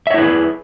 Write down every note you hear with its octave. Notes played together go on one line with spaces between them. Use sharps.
E4 G#4 B4 C#5 E5